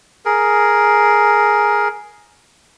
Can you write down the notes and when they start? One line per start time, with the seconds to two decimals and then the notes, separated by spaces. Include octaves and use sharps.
0.25 G#4 A#4